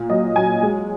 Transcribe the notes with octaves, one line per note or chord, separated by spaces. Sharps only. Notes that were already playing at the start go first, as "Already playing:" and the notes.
Already playing: A#2
F#3 D#5
F#3 G#5
G#3